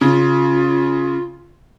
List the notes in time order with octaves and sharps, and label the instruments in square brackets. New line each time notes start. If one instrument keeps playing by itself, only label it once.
[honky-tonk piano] C#3 [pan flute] F4